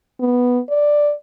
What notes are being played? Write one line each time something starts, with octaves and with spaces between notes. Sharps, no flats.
B3
D5